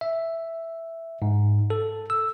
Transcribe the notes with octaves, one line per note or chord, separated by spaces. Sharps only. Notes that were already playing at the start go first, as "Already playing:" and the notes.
E5
G#2
A4
E6